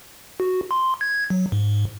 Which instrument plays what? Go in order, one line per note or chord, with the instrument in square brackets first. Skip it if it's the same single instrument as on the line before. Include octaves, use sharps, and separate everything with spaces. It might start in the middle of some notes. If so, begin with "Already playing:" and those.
[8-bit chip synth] F#4
C6
G#6
F#3
G#2